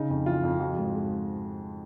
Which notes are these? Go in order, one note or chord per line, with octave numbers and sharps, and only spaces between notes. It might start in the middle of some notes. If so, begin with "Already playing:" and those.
Already playing: C#3 D#4
F2
E3 F4
F2
F3 F#4
G#2
G#3